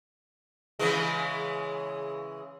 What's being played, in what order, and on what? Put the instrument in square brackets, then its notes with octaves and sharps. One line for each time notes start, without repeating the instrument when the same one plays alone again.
[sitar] C#3 E3 G#3